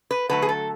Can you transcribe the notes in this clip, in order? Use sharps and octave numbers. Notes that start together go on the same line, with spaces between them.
B4
D3 F#3 A3 B4
G#4
A4